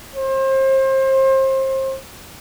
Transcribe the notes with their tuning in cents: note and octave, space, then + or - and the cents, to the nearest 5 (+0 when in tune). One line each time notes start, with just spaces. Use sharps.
C5 +30